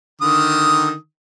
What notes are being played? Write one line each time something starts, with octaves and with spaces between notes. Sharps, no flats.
D3 D#3 D#6